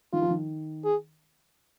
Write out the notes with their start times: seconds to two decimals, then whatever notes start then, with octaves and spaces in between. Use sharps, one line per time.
0.13 D#3 F4
0.22 F3
0.30 D#3
0.84 G#4